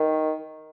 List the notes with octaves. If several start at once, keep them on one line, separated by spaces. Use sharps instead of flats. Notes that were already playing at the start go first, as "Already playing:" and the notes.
Already playing: D#3